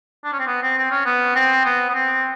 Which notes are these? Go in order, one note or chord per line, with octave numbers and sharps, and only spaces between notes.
D4
C#4
C4
B3
C4
C4
C#4
B3
C4
B3
B3
C4